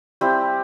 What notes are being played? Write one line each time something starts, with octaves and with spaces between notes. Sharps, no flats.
G3 C4 E4 G4